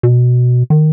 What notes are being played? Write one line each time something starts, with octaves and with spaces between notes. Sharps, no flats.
B2
D#3